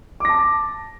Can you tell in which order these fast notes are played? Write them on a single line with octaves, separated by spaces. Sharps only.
D6 A#6 A5